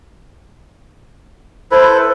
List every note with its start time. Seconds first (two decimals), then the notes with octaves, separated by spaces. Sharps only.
1.71 E4 A4 B4 C5